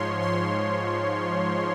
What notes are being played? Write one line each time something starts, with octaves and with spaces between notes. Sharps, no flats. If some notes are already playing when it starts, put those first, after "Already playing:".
Already playing: G#2 F3 C#5 C6
C6